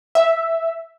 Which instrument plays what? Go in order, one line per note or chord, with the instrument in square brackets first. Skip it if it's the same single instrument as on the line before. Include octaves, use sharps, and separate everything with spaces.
[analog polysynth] E5